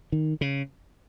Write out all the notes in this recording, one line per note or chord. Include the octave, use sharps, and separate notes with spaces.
D#3
C#3